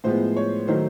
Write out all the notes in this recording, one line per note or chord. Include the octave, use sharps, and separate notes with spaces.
A2 F3 G#3 B3 C5
C#5
D#3 F#3 A3 C5